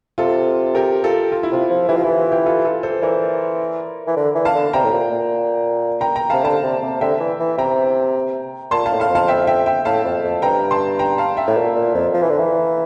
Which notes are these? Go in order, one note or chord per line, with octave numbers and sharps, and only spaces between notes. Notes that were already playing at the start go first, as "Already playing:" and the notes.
C3 F4 A4
G4 A#4
F4 A4
F4
E4
C3 F4
F3
E3 E4 G4
F3
E3 E4
F4
E4 G4
F4 A4
F4 A4
A4 C5
E3 A#4 D5
E3
D3
E3
F5 A5
D3
C3 G5 A#5
A2
A#2
A#2
G5 A#5
G5 A#5
C3 F5 A5
D3 F5 A5
C3
C3
D3 E5 G5
E3
E3
C3 G5 A#5
A#2 A5 C6
F5 A5
A2
F5 A5
F2
F5 A5
E5 G5
E5 G5
E5 G5
A2 F5 A5
F2
F2
G2 G5 A#5
A5 C6
G5 A#5
F5 A5
E5 G5
A2
A#2
A#2
F2
F3
E3
D3
E3